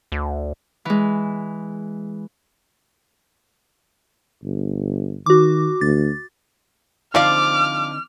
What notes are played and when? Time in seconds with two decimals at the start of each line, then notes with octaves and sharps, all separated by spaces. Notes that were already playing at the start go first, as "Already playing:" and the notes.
0.12 D2
0.85 E3 G#3
4.43 G1
5.26 D#3 F#4 D6
5.81 D2 A6
7.15 D3 F3 C4 D#4 D5 F5 D6 F6